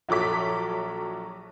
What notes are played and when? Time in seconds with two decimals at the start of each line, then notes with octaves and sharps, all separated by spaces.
0.09 A#1 F#3 A4 D6 B6